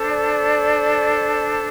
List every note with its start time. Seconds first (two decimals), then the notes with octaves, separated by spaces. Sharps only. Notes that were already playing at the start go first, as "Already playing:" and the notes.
Already playing: D4 A4 C5
0.09 D5